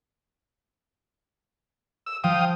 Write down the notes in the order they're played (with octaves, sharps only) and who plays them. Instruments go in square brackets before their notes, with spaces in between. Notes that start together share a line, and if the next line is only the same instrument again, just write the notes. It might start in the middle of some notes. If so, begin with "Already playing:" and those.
[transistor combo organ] E6
[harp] F3 [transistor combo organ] F5 G5 D#6